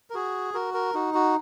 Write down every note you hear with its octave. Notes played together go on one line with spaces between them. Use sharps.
A#4
F#4 G#4
F#4 A#4
A#4
D#4 F#4
F#4